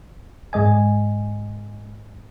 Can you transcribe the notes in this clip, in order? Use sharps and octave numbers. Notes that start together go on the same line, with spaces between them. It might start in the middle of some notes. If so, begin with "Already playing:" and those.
G#2 G#3 D#5 G#5